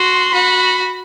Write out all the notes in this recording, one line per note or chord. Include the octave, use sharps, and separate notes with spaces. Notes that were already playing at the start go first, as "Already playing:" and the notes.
Already playing: F#4 C6
F#4 B5